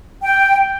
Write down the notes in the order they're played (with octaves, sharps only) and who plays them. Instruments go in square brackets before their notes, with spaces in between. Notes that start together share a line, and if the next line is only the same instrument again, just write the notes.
[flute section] G5